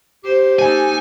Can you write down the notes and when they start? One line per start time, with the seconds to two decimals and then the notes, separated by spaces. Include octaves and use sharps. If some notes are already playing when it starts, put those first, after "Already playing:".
0.24 G4 C5
0.59 A#3 D#4 A4 G#5